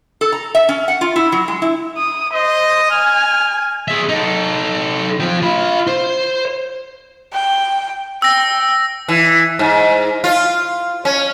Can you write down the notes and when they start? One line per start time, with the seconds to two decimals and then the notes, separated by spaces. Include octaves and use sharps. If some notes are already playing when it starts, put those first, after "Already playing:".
0.21 A4
0.32 A#5
0.55 E5
0.69 C#4
0.88 F#5
1.01 F4
1.16 E4
1.32 F#3
1.48 G#3
1.62 E4
1.97 D#6
2.33 C5 D#5
2.91 G#5 F6
3.88 G#4 E5
4.09 D#4 A4
5.20 F3 G5
5.42 F4 B5
5.87 C5
7.33 G5
8.22 G5 E6 A#6
9.08 E3
9.59 G#2
10.24 F4
11.05 C#4